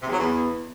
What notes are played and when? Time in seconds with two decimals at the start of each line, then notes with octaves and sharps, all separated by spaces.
0.01 C3
0.07 E2
0.12 F#3
0.18 E2